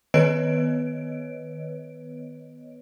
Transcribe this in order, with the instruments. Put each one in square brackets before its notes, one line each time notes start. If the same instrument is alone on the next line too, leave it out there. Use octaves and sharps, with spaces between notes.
[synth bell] D#3 B3 B4 C#5 D#5 D7